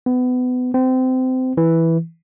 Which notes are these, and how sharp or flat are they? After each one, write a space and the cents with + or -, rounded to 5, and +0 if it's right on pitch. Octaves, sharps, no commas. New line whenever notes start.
B3 +25
C4 -25
E3 -5